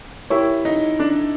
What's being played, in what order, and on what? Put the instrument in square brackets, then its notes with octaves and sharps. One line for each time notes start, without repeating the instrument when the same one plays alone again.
[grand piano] E4 [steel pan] G4 A#4 C#5
[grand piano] D#4
D4